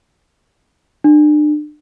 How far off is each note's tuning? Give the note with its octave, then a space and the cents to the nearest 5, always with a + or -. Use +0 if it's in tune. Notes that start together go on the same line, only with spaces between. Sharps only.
D4 +35